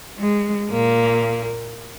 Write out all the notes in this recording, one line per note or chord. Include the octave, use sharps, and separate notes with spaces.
G#3
A#2 A#3